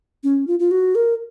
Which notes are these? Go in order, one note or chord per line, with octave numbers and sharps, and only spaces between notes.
C#4
F4
F4
F#4
A#4